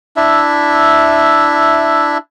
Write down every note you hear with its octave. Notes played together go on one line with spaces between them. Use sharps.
D4 E4 E5